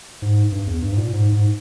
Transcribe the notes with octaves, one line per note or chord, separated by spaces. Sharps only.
G#2
G2
E2
G2
G#2
A#2
G#2
G#2